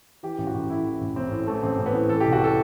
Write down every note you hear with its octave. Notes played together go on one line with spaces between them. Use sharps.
E3 G4
A1
F#4
A1
A2 E4
E3
A1
A1 C4
A2
E3 A3
A1 C4
A1
B3
A2
E3 A4
G4
C2
F#4
A4